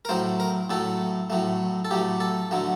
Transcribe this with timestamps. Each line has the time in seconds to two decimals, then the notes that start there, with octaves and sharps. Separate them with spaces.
0.05 A#4
0.09 A2 F#3 A3 C5
0.40 A#4
0.70 A2 F#3 A3 A4
1.30 A2 F#3 A3
1.85 A4
1.91 A2 F#3 A3 G4
2.20 A4
2.51 D3 F#3 A3